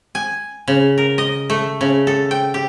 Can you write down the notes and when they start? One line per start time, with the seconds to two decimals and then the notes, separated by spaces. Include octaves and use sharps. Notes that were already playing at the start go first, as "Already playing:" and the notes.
0.15 G#5
0.68 C#3
0.98 A#4
1.18 D#5
1.50 A3
1.81 C#3
2.07 A4
2.31 G5
2.54 G4